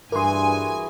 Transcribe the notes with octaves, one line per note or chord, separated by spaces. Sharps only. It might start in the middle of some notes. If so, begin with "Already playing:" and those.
G2 E3 F#4 G#4 A#4 G#5 C6